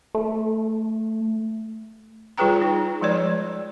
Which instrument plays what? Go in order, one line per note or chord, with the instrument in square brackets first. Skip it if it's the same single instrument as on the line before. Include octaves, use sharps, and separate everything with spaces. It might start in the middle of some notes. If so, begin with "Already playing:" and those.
[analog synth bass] A3
[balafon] G3 F4 G#4 B4 G5 A#5
D#4
F3 G#3 C#5 D5